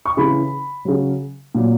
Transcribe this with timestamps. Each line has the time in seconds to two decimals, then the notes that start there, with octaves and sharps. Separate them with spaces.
0.05 C#6
0.17 C#3 E3 B5
0.85 C#3 F#3
1.55 A#2 F#3